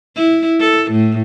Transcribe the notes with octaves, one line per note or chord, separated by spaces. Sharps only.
E4
A4
A2